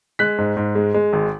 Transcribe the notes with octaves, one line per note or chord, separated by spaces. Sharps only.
G#3 F#6 B6
G#2
G#2
G#3
G#3
G#1